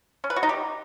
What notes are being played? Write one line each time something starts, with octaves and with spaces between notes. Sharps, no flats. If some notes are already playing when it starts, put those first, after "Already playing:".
C#4
B4
F#4
D#4
G4